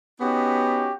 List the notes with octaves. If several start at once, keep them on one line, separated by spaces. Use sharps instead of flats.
B3 C#4 D#4 F#4 G4